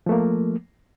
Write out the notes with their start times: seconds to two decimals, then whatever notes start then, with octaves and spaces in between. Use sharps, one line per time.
0.06 F3
0.09 A3
0.12 A#3